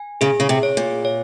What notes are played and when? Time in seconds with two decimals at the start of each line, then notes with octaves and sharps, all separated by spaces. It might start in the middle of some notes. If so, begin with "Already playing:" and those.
Already playing: G#5
0.21 C#3 G#4
0.40 C#3
0.49 C3
0.63 C#5
0.77 A#2
1.05 C#5